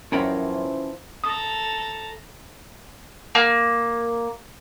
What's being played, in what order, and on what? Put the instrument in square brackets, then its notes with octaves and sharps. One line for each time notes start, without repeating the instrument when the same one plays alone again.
[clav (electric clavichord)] F#2 F4 A#4 [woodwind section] E3 F3 [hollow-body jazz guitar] C#4 G5 B5
[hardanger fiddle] A4 A#5 [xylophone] D#6
[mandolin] A#3